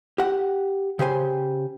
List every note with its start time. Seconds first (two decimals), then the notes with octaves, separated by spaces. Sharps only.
0.18 G4 F#5
0.99 C#3 G4 C5 G#5